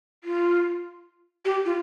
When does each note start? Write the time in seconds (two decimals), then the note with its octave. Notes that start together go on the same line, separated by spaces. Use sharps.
0.24 F4
1.45 G4
1.66 F4